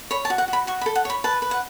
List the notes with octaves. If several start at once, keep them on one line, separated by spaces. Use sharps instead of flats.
C#5 B5
A5
F#4
F#5
F#4
B5
F#4 C#6
B5
A4
F#5
C#5 B5
B4 A5
B4
F#5